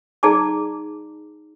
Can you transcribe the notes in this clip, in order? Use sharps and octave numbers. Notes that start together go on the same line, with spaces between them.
D#4 G#4 D5 A5 A#5 D6